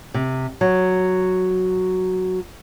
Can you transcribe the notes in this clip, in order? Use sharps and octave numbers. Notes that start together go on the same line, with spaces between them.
C3
F#3